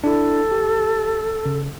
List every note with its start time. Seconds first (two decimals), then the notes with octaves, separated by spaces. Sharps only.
0.04 D4 E4 A4
0.51 G4
1.46 C#3